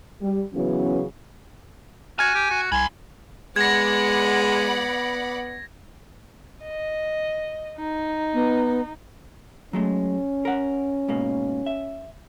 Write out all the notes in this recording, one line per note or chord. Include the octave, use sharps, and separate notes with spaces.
G3
C#3 E3 F#3 B3 C#4
F#4 G#5 F6 G#6
G4
F#4
C2 G#5 B5 C6
G#3 B3 D5 F#5 B5 G#6 A#6
D#5
D#4
B3
F#3 G#3 A3 C#4
A#4 F#5
G#2 B2 A#3
E5